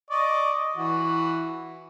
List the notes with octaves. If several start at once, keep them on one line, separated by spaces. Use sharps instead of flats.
D5 D#5 C#6
E3 F#4